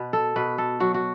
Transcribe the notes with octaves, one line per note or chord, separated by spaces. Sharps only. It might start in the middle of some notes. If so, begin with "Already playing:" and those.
Already playing: B2 B4
A4
B2 B4
A4
F#3 F#4
F#4